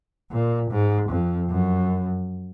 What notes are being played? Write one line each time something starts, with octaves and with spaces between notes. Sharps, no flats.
A#2
G#2
F2
F#2